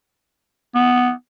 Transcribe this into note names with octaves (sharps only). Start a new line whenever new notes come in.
B3